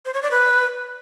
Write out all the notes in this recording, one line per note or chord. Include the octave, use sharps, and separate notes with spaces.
C5
C#5
D5
B4